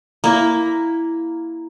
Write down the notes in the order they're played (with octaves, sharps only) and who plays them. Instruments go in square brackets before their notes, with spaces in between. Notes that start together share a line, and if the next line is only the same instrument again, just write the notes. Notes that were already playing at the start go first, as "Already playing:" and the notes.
[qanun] A#3 E4